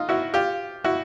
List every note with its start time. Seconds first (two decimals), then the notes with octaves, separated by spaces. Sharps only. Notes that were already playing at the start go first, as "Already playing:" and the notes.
Already playing: D#4 F4
0.09 E4 F#4
0.34 F4 G4
0.84 E4 F#4